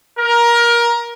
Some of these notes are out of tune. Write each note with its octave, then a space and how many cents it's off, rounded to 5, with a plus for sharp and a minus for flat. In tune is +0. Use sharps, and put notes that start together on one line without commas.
A#4 +20